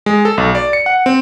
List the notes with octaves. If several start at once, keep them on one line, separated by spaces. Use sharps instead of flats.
G#3
A4
B1
D5
C#7
F#5
C4